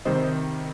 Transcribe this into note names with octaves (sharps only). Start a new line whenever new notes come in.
C3 D#3 G3 C5 D#5